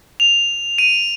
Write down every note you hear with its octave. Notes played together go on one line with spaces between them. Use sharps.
F7
D#7